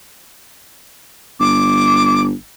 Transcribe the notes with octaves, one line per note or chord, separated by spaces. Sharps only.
G1 D6